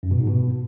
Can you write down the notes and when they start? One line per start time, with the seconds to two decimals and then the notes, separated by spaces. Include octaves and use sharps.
0.03 F#2
0.11 B2
0.19 G#2
0.27 B2